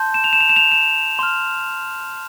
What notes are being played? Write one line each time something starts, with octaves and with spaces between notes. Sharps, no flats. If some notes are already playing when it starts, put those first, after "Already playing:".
Already playing: A5 C6 G6
E7
F7
E7
F7
E7
F7
E7
C6 F6